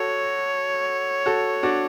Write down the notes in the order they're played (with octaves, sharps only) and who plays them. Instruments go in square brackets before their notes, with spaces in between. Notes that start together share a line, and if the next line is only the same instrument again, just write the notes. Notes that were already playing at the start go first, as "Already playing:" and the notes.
Already playing: [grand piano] F#4 A4 [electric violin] C#5
[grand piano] F#4 A4
D4 F#4